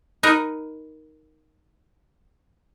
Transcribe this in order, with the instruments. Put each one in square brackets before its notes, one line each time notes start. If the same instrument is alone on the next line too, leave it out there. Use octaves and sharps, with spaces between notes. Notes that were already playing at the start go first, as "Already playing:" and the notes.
[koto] D#4 A#4 B4